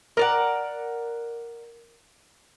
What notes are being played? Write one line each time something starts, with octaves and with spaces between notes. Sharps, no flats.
A#4 D5 F#5